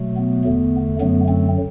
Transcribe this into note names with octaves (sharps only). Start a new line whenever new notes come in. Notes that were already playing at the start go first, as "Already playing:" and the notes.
Already playing: B2 F#3 A3
B3
E2 D3 A3
F#2 D3 F#3 A3 B3
A3 C4